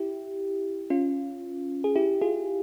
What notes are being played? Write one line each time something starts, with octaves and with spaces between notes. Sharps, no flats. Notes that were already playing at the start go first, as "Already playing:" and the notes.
Already playing: E4 G4
C#4 F4
G#4
E4 G4
F4 G#4